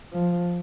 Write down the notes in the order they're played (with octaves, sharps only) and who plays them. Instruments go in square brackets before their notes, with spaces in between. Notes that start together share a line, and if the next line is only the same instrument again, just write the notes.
[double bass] F3